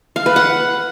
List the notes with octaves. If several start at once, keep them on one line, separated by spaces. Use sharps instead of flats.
F5
B4
F#5